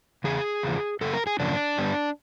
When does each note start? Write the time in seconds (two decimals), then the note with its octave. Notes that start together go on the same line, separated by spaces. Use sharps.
0.24 E2 C#3 G#4
0.63 E2 C#3 F3
1.01 F#2 C#3 A#3 A4
1.13 A#4
1.27 G#4
1.40 F#2 C#3 F3 A#3 D4
1.78 D3 G3 B3